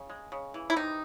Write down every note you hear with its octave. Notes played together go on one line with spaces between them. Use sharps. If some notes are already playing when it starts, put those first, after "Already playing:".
Already playing: C#3
G#3
C#3
E3
E4
C3 D#4